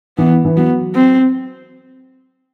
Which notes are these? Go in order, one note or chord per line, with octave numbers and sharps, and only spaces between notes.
E3 B3
E3
F#3 B3
C4